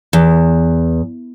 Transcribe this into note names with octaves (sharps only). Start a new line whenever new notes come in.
E2